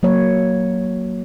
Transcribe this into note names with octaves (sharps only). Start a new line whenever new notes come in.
F#3 A#3 C#5